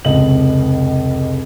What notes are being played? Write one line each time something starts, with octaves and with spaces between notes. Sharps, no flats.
F1 C#2 D#5 F#7